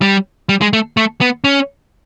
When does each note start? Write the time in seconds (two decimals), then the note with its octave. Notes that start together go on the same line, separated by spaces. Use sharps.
0.02 G3
0.49 G3
0.61 G#3
0.73 A3
0.97 A3
1.21 B3
1.44 C#4